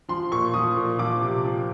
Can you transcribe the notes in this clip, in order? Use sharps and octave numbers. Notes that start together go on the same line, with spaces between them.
F3 C6
A#2 C#6
F3 D#6
A#2
F3 D6
C3
F3